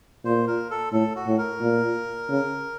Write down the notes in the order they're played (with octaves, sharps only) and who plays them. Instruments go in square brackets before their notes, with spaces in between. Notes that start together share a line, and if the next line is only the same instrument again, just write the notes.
[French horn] A#2 [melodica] C5
[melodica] A#4
A4
[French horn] A2 [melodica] A4
[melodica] F#4
[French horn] A2
[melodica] A#4
[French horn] A#2
C#3